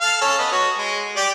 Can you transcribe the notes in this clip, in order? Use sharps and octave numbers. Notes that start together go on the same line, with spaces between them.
A4 F5
C#4 A4
B3 D#5
F#4 C#5
G#3
G4 D5